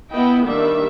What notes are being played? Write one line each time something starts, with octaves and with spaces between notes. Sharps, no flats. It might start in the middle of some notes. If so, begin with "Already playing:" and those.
B3 E4 D#5 G5
D#3 G3 A#3 D4 E5